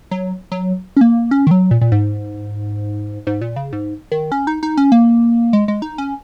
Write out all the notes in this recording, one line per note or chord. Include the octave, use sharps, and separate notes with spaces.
F#3
F#3
C#4
A#3
C#4
D#3
F#3
A#2
A#2
G#2
G#2
A#2
C#3
G#2
D#3
C#4
D#4
D#4
C#4
A#3
G#3
G#3
D#4
C#4